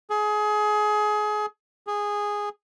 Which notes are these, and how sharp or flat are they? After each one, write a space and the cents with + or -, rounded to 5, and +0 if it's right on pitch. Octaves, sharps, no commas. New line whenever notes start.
G#4 +25
G#4 -10